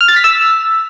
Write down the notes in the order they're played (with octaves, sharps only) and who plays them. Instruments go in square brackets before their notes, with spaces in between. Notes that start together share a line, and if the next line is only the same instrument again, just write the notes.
[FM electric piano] F6
A6
B6
E6